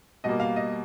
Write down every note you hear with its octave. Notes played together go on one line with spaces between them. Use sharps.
B2 G3 A#3 D#5
F5
D#5